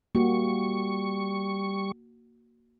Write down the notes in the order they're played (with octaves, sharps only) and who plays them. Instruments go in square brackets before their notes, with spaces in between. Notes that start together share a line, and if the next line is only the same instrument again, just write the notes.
[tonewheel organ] G3 C#6 [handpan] A#3 F#4